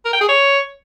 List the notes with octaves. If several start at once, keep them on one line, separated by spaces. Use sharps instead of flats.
A#4
G5
G#4
C#5